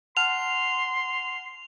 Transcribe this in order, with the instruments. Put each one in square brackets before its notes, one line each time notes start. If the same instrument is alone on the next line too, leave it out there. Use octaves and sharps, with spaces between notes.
[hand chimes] F#5 A5 F6 [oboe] C6 [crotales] F7